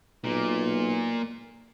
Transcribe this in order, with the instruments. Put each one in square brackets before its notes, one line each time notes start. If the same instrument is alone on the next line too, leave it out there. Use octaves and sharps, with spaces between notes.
[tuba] B1 [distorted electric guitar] A#2